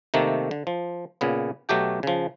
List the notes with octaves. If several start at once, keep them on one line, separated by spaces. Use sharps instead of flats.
C3 D#3 A3 A#3
D3
F3
A#2 C#3 B3
B2 F#3 A3 G4 G5
C#3 F3